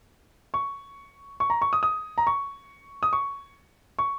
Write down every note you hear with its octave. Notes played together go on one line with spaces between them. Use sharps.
C#6
C#6
A#5
C#6
D#6
D#6
A#5
C#6
D#6
C#6
C#6